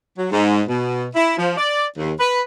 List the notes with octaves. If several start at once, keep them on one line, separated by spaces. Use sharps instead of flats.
F#3
G#2
B2
E4
F3
D5
D#2
B4